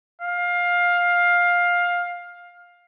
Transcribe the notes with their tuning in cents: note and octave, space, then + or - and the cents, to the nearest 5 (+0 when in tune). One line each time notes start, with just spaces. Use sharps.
F5 +15